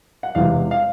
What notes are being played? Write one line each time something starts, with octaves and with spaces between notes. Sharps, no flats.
F#5
E1 E2 C3 E3 G#3 F5
F5